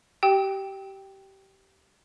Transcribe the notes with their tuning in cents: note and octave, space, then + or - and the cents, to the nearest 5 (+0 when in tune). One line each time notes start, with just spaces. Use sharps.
G4 -25 G5 +0 E6 -45